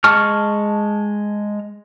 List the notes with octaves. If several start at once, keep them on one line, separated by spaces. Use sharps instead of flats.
G#3 A5 C#6 F6